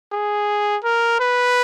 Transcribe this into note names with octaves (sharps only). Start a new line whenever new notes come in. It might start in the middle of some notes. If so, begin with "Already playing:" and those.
G#4
A#4
B4